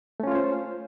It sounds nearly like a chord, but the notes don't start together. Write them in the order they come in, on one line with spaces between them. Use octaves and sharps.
A3 C#4 F4 C#5 C5